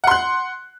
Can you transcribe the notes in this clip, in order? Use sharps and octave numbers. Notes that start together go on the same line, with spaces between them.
F#5 C6 F#6